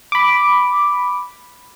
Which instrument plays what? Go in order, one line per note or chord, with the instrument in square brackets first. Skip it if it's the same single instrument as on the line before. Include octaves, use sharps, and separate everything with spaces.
[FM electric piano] B5 D6